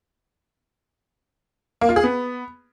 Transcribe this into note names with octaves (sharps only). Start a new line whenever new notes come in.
A#3
F4
G#4
B3